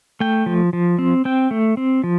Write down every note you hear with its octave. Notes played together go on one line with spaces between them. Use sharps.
A3 G5
F3
F3
C4
C4 G5
A3
C4
F3